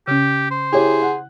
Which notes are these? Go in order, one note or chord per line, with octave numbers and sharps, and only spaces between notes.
C#3 C#4 G4
C5
E4 G4 G#4 C#5
F#5